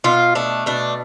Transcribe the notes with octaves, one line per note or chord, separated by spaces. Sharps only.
B2 F4
A3 D4
B2 D4